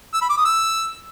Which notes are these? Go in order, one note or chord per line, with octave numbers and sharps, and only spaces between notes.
E6
B5
D6
D#6
E6